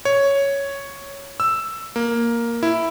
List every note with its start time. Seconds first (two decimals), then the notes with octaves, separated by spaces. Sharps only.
0.05 C#5
1.40 E6
1.96 A#3
2.63 E4